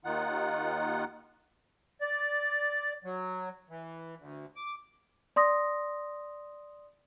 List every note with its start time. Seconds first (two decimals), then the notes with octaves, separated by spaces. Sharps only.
0.05 D#2 D#3 D#4 F4 F#5
2.01 D5
3.04 F#3
3.70 E3
4.18 D2
4.56 D6
5.36 D5 C6 D#6 A#6